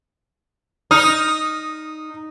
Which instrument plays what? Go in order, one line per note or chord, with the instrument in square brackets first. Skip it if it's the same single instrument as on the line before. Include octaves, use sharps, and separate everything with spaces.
[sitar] D#4 [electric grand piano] D#6 F6